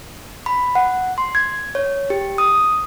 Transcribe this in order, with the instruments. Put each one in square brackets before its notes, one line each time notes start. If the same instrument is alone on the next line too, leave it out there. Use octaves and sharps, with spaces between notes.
[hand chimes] B5
F#5
C6
G#6
C#5
G4
D#6